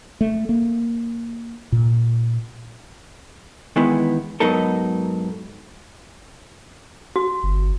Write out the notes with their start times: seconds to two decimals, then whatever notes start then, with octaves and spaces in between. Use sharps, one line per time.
0.21 A3
0.49 A#3
1.72 A#2
3.76 D#3 E3 G#3 B3
4.40 G#2 F#3 B3 D#4 A4 A#4
7.16 F#4
7.43 G1